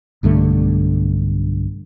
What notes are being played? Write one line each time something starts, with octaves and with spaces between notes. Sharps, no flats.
B1 G2 D3 A3